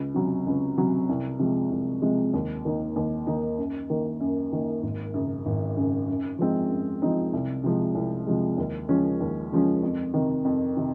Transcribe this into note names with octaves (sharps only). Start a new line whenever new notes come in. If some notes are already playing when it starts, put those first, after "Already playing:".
Already playing: C#2
C3 F#3 C#4
C#2
C3 F#3 C#4
C2
C3 F3 G#3
C2
C3 F3 G#3
D#2
D#3 A#3 D#4
D#2
D#3 A#3 D#4
F#2
D#3 A#3
F#2
D#3 A#3
G#1
F#2 C#3
G#1
F#2 C#3
F#2
F3 G#3 C4 D#4
F#2
F3 G#3 C4 D#4
C2
C3 F3 G#3
C2
C3 F3 G#3
D#2
C#3 F3 G#3 C#4
D#2
C#3 F3 G#3 C#4
F2
C3 D#3
F2
C3 D#3